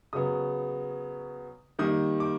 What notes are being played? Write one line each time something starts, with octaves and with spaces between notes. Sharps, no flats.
C#3 F#3 B3 D#6
D#3 G3 A#3 D#6
D6